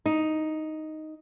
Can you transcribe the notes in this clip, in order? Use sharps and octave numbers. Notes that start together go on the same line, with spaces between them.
D#4